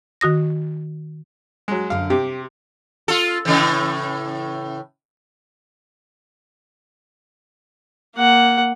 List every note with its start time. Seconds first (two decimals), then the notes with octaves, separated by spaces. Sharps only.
0.21 D#3 F#4 D#6 A#6
1.68 F#3 G#3
1.90 F#2 D3 F5
2.10 C3 G4
3.08 F4 A4
3.45 A2 C#3 E3
8.16 A#3 F#5